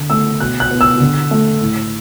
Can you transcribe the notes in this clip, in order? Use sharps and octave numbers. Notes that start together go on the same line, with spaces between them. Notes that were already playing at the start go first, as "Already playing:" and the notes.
Already playing: D3
A3 E6
B2 F#6
F#6
B3
E6
D3
A3
A2